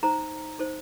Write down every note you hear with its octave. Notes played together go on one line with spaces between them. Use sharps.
D#4 A4 C5 A#5
D#4 A4 C5